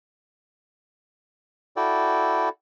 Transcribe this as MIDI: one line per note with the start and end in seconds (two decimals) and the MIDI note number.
1.76 2.49 64
1.76 2.49 66
1.76 2.49 69
1.76 2.49 74
1.76 2.49 79